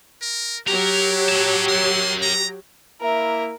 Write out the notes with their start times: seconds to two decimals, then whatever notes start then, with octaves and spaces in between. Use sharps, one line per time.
0.21 A#4
0.67 F#3 F#4 G4 A#4
1.29 E4 A5
1.68 A#4 E5 C6
2.22 A#5
3.01 A#3 E4 A#4 E5